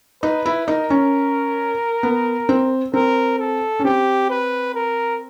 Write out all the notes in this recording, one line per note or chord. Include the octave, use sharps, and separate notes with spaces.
D#4 B4
E4
D#4 A#4
C#4
B3
C4
C4 A#4
A4
C#4
C4 G4
B4
A#4